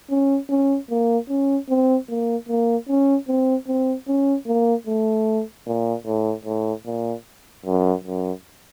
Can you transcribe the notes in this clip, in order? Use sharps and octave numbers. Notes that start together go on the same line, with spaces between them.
C#4
C#4
A#3
C#4
C4
A#3
A#3
C#4
C4
C4
C#4
A#3
A3
A#2
A2
A2
A#2
F#2
F#2